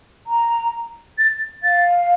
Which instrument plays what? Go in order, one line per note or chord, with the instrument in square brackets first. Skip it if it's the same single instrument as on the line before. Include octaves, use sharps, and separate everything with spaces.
[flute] A#5
[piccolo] A6
[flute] F5 [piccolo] A6